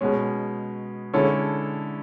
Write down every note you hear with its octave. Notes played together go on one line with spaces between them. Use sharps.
B2 G#3 C#4
D3 G#3 C#4 E4 A4